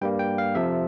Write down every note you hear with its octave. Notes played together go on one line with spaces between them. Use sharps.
G2 G3 A#3 G5
G5
F5
F2 C3 F3 E5